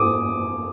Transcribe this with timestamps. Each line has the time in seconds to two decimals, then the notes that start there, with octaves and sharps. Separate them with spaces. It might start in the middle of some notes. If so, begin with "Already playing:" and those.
Already playing: D6 D#6